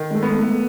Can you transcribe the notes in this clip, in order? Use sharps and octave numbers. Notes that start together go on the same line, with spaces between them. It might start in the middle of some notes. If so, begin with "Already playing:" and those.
Already playing: D#3
G#3
A3
B3
G#3
A3